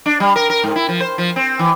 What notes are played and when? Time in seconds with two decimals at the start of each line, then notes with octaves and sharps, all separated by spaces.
0.06 D4
0.20 G3
0.36 A#4
0.50 A#4
0.64 G#2
0.76 E4
0.89 F3
1.00 C5
1.18 F3
1.36 C4
1.59 E3